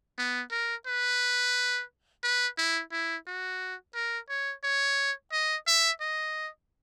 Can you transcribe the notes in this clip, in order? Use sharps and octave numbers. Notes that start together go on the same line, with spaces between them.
B3
A#4
B4
B4
E4
E4
F#4
A#4
C#5
C#5
D#5
E5
D#5